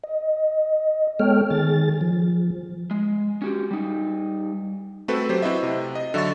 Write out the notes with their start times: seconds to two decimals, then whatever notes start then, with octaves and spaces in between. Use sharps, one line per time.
0.04 D#5
1.19 G#3 B3 A4 C#5 G5 F6
1.50 D#3 G#4 A6
2.01 F3
2.91 G#3
3.42 C#4 F#4 G4
3.71 G3 D#4
5.08 A3 C4 F#4 A4 B4
5.29 F#3 G4 C5
5.42 C4 E4 F#4 D#5 E5
5.63 C3
5.95 D#5
6.14 D3 F#3 E5 C#6 A6